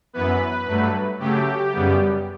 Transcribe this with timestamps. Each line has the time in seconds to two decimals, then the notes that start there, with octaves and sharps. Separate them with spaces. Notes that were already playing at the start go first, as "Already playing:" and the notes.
0.13 F#2 E3 B3 B4
0.67 G2 F#3 A3
1.19 C#3 F#3 A3 G4
1.72 F#2 C#3 G3 B3